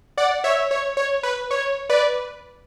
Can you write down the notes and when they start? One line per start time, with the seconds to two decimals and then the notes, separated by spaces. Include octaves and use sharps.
0.18 D5 F#5
0.44 C#5 E5
0.71 C#5
0.97 C#5
1.23 B4
1.51 C#5
1.89 B4 D5